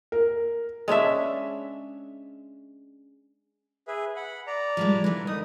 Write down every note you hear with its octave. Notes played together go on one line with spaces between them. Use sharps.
A#4
G#3 C#4 D4 E5
G#4 B4 E5
F#5 B5
D5 A#5
F3 G3 G#3
D3 E3 B4
F#2 D#4 D#6